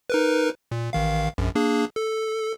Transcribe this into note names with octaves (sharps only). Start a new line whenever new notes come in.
D#4 A#4 B4
A#2
A1 D#3 F5
A#1 F#2
A#3 D4 G#4
A4